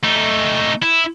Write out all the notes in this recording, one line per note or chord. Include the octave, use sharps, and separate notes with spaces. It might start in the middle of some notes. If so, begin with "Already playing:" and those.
A3 D#4
E4